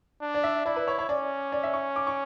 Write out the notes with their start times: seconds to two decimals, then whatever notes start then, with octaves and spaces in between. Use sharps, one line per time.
0.22 D4
0.34 D5
0.44 E5
0.66 E4 D5
0.76 B4
0.88 C#5
0.99 C#5
1.09 C#4 D5
1.52 D5
1.63 E5
1.74 C#6
1.96 D6
2.07 C#6